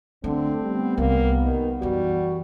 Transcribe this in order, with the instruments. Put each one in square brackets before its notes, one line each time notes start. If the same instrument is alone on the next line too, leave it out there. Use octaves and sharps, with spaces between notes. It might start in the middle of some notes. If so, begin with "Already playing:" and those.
[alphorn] D3 [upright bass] A3 [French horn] C4
[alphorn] G3 [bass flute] B3
[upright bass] C2 [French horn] A#3
[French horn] D#3
[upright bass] F#2 E3 [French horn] G3 [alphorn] F#4